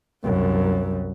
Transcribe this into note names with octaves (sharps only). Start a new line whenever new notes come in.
C2 F#2